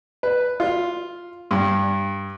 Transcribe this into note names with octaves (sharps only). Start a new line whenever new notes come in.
B4
F4
G2